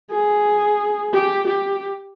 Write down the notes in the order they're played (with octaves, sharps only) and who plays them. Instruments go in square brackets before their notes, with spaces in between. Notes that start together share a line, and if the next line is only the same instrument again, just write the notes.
[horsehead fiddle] G#4
G4
G4